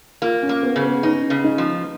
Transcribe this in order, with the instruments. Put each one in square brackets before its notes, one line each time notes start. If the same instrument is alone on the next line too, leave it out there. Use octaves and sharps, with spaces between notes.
[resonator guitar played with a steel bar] A#3 [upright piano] F4
[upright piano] C#4
[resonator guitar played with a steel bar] A#3
[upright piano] B3
[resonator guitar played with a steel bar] C#3
[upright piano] B3
[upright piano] C#4 [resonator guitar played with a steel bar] D#4
[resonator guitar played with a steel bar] C#3
[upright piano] D#4
[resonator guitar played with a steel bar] F3